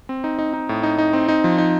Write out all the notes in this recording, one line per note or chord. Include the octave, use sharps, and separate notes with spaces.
C4
D#4
D#4
D#4
A2
D#4
D#4
C4
D#4
F3
D#4